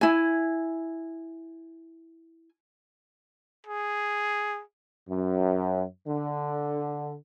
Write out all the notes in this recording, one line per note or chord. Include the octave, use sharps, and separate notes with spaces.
E4 G#5
G#4
F#2
D3